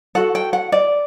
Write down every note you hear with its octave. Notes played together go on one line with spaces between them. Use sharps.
F#4 A4 F#5
G5
F#5
D5